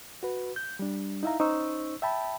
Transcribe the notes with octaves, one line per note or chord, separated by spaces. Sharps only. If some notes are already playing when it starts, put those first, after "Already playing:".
F#4 B4
G6
G3 D4
D#4 E4 E5 F5 A#5
C#4 D#4 C5 C#6 E6
E5 G5 A5 B5